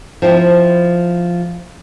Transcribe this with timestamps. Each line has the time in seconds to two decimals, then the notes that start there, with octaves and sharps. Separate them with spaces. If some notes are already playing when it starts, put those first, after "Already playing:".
0.22 F3 C4 E4